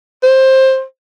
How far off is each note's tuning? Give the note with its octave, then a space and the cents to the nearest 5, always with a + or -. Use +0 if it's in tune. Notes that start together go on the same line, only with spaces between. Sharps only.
C5 +15